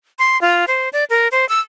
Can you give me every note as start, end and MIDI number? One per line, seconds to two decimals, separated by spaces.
0.19 0.40 84
0.41 0.65 65
0.68 0.89 72
0.93 1.04 74
1.10 1.28 70
1.32 1.47 72
1.49 1.59 88